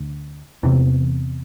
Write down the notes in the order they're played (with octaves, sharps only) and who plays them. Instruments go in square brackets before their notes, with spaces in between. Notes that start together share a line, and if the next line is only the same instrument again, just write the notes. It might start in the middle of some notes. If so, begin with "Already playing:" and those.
Already playing: [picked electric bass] D2
E2 C3 E3